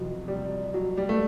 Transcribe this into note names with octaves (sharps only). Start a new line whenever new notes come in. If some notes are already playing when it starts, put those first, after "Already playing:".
Already playing: F2 C3 E3 F#3
G3
F#3
G3
A3